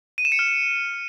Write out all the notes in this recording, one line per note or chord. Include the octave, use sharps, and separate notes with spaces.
D#7
E7
C#7
F6